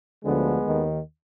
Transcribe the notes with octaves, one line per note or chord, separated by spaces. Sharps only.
D2 D3 F3 G#3 B3
D#2 D#3